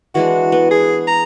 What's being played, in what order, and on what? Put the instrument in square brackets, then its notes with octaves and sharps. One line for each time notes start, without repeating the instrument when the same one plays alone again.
[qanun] E3 G#3 D4 [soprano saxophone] F#4
[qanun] B3
[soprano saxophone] G#4
A#5